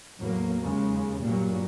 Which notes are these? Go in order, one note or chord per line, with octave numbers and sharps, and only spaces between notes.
E2 A2 F#3 A#3
D#2 C#3 G#3
G2 A#2 F#3 G3 A#3